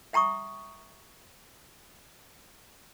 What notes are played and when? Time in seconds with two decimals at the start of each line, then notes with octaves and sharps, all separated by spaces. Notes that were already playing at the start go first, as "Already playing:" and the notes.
0.13 E5 G5 A#5 C#6 D#6